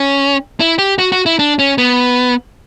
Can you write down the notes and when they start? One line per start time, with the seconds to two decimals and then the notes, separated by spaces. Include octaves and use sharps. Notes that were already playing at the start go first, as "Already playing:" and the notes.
Already playing: C#4
0.60 E4
0.78 G4
0.98 F#4
1.12 F#4
1.26 E4
1.39 D4
1.59 C#4
1.78 B3